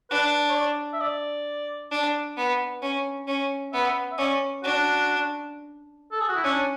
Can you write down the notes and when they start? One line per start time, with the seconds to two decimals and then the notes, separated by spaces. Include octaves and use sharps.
0.11 D4 B4
0.50 C#5
0.55 D5
0.93 E5
1.01 D5
1.91 D4
2.37 B3
2.82 C#4
3.28 C#4
3.72 B3 E5
4.12 E5
4.18 C#4 D5
4.63 D4 F#4
6.12 A4
6.20 G#4
6.29 F#4
6.36 E4
6.44 C#4 D4